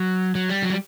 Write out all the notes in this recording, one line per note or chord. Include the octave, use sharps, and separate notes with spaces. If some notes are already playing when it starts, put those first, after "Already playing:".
Already playing: F#3
F#3
G3
F#3
G3